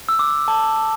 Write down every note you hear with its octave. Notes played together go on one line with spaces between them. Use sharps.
E6
D6
A5